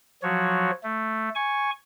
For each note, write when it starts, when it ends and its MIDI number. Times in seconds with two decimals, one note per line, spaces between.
0.23 0.71 53
0.23 0.71 54
0.23 0.71 66
0.23 0.71 73
0.83 1.29 57
1.35 1.70 80
1.35 1.70 85